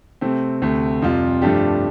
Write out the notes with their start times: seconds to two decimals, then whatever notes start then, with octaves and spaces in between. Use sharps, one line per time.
0.21 C3 A3 C4
0.62 D2 C3 A3
1.02 F2 C3 G3 F4
1.42 G2 F3 A3 D4 G4